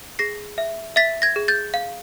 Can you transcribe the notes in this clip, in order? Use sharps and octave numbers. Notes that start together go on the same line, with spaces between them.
G#4 A#6 C7
E5
E5 A6 B6
G#6 A#6
G#4
G6 A6
F5